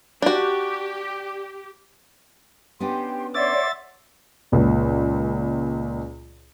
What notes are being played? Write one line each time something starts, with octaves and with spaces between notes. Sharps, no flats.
D4 F#4 G4
B3 C#4 D4 G4 C6
C#5 D5 E5 F#5 C6 A6
C#2 A#2